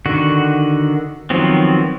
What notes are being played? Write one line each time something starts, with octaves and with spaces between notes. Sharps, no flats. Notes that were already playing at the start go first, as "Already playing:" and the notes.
D3 D#3 F#4
D#3 F3 F#3 B3 C4